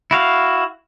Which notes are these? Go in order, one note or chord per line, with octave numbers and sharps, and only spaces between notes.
E4 F#4 F5